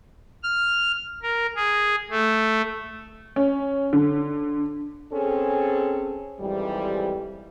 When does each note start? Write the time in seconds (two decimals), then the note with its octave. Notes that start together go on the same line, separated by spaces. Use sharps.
0.43 F6
1.23 A#4
1.56 G#4
2.10 A3
3.36 C#4
3.93 D3
5.13 C4 C#4 G#4 A4
6.40 F2 G#2 E3 G3